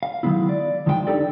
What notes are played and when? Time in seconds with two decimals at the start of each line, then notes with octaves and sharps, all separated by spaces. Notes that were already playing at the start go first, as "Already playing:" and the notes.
0.03 F5
0.23 D#3 E3 F#3 G#3 B3 E4
0.49 D5
0.86 E2 D#3 F3 G#3 C5 G5
1.07 D4 D#4 G4 A4 D5